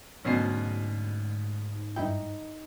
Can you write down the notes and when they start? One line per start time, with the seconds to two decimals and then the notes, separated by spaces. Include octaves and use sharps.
0.24 D2 G#2 B2 F#3 C#4 C7
1.96 G2 D#4 E4 G5